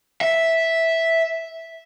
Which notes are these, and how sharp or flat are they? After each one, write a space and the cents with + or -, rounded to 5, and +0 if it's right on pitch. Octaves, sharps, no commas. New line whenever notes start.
E5 -5